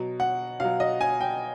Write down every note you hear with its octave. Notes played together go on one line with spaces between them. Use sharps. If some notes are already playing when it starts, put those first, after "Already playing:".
Already playing: B2 F#3
F#5
B2 F#3 F5
D#5
G#5
G5